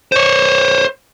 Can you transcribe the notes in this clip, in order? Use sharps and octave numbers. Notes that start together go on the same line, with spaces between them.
C5 C#5